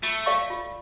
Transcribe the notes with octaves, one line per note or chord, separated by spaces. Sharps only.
A3 F4
A4 D5 F5 C#6
F4